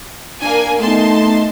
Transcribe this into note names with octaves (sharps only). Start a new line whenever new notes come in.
A#3 D4 G#5
A3 B3 D#4 A5 C6